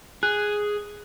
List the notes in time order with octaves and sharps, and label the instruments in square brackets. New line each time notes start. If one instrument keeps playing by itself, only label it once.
[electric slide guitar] G#4 [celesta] F#6